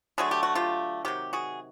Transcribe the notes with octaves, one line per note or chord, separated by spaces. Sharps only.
D3 F#3 A3 G#4
G4
F#4
F4 G4
C3 D#3 F#3 G4
F#4 G#4